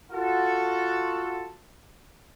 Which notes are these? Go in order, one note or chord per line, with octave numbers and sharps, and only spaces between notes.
F4 F#4 A4